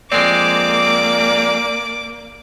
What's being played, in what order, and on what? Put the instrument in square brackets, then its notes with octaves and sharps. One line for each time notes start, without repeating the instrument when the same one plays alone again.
[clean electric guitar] F2 G#3 C4 [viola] A#3 [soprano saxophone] D5 [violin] D6